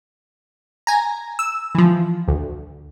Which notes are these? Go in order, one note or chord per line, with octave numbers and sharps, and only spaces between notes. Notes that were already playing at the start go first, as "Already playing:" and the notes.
G#5 A#5
E6
E3 F3
D2